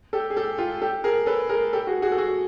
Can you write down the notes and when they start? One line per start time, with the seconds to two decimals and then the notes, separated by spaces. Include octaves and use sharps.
0.13 G4 A4
0.30 G#4
0.37 G4 A4
0.58 F4 G4
0.82 G4 A4
1.04 G#4 A#4
1.26 A4 B4
1.49 G#4 A#4
1.73 G4 A4
1.87 F#4 G#4
2.02 F#4 G#4
2.12 A4
2.17 F#4 G#4